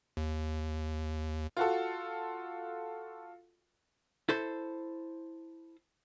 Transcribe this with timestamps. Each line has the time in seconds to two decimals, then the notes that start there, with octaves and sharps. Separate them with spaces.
0.17 D#2
1.57 F4 F#4 A4
4.29 E4 A4 C5